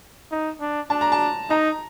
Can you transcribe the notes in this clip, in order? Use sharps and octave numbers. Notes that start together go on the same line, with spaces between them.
D#4
D4
D4 A5
A#5
A5
D#4 A#5